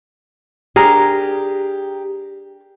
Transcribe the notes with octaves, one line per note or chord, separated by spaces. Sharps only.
D4 G4 G#4 A#4 A#5